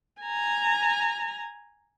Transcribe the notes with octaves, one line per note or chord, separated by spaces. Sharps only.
G#5 A#5